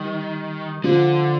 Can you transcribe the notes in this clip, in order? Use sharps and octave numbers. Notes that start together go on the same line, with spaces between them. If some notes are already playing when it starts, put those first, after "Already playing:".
Already playing: D#3 G3
D3 F3